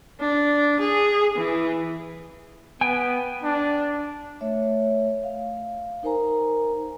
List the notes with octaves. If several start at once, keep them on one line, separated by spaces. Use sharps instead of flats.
D4
G#4
E3
B3 G5 G#5
D4
A3 C#5 E5
F5
D#4 A#4 C5 G#5 A#5